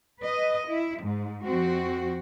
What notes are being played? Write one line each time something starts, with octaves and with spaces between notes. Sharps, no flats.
B4 D#5
E4
G#2
F2 C4 F#4